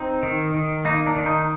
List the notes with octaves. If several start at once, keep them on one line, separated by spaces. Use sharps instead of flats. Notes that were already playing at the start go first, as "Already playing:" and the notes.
Already playing: C4 D#4
D#3
D#3
A#3 D#4
D4
D#3
D#4